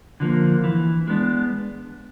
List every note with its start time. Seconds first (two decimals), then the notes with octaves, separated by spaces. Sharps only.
0.20 D3 F3 A#3
0.64 E3
1.07 G#3 B3 D4